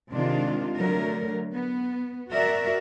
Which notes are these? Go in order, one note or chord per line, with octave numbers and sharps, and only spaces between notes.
C3 D#3 G#3 D4 F4
D3 F#3 A3 A#4
B3
F#4 A#4 D5 E5